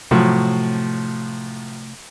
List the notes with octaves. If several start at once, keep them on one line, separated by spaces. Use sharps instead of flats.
A2 C3 F3 F#3 A3